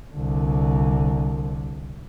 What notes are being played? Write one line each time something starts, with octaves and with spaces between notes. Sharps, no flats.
C2 D3